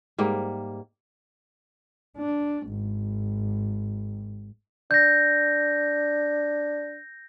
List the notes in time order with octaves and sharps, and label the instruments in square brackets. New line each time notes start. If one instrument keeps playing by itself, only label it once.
[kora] G#2 G3 A#3
[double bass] D4
G#1
[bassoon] D4 [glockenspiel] G6 A#6